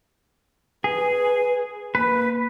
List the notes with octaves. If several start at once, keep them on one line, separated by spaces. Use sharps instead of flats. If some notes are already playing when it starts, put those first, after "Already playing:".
G#4 B4
A#3 B4